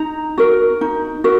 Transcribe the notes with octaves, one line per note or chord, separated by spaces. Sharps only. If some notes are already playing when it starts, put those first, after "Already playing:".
Already playing: D#4 A#5
F#4 A#4
D#4
F#4 A#4